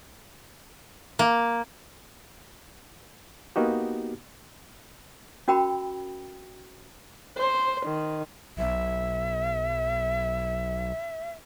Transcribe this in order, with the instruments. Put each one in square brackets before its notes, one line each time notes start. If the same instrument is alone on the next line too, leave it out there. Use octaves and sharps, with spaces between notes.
[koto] A#3
[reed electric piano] A#3 B3 D#4 F#4 G4
[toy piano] C#4 F#4 A#4 G5 B5
[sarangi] C5
D#3
[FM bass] B1 [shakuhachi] E5